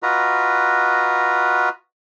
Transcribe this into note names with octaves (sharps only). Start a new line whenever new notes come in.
F4 F#4 B4 D#5 A#5